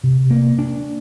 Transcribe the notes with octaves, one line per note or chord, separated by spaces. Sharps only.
C3
A#3
D4